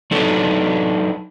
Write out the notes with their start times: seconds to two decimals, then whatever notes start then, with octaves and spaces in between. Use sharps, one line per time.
0.11 F#3 D4 D#4 A4 B4